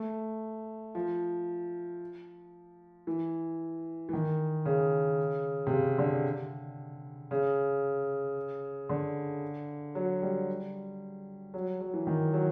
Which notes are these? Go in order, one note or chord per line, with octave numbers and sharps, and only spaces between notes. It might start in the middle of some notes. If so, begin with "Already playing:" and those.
Already playing: A3
F3
E3
E3
D#3
C#3
C3
C#3
D3
C#3
D3
F#3
G3
F#3
F#3
E3
D#3
F#3